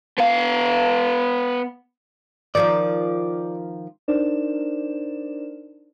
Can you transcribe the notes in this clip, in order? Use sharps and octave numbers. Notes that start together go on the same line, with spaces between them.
B3 F5
D#3 F3 A#4 D5
D4 D#4 A#4 C5 D5 E7